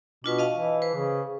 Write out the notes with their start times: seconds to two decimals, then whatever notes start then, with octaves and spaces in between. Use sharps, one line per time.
0.24 B2 D4 F4 B4
0.39 D#5 F5 A5
0.53 E3
0.82 B4 C5
0.94 C#3